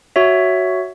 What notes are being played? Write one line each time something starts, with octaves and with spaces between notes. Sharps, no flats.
F#4 C#5 E5